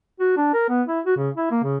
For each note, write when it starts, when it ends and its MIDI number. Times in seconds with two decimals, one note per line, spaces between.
0.20 0.37 66
0.37 0.51 62
0.54 0.69 70
0.69 0.82 59
0.88 1.00 64
1.05 1.15 66
1.17 1.30 49
1.37 1.48 64
1.51 1.61 58
1.64 1.77 49